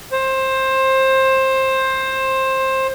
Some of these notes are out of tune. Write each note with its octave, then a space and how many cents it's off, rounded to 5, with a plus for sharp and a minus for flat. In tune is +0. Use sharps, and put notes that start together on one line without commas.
C5 +20